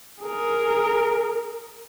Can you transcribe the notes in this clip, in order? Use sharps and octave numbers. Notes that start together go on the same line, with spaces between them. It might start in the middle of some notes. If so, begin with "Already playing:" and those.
G#4 A#4